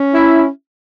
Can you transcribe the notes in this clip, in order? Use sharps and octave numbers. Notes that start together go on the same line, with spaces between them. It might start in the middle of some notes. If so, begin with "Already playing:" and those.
Already playing: C#4
E4